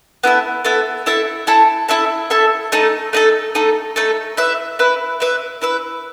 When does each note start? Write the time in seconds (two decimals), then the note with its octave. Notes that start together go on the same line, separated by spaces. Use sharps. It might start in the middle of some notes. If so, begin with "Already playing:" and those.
0.24 B3 E4 A4 E5
0.65 B3 E4 A4 E5
1.06 E4 A4 E5 A5
1.47 E4 A4 E5 A5
1.89 E4 A4 E5 A5
2.30 E4 A4 E5 A5
2.72 A3 D#4 A4
3.13 A3 D#4 A4
3.55 A3 D#4 A4
3.96 A3 D#4 A4
4.37 E4 B4 E5
4.79 E4 B4 E5
5.20 E4 B4 E5
5.62 E4 B4 E5